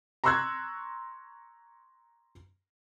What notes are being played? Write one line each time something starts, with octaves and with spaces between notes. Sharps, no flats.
A#5 C6 C#6 E6 F#6 G#6